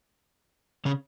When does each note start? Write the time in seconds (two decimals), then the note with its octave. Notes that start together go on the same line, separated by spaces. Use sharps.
0.85 C#3 C#4